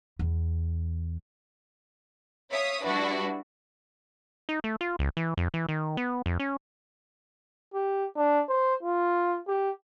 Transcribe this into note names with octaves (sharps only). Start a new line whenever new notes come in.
E2
C#5 E5 F5 D#6
G3 D4 E4 F#4 B4
D#4
A3
F4
C#2
E3
F2
E3
D#3
B3
F2
C#4
G4
D4
C5
F4
G4